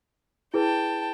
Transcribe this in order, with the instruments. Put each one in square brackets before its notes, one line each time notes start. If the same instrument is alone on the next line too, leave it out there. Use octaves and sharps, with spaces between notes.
[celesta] E4 G#4 B4 [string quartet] G5 A5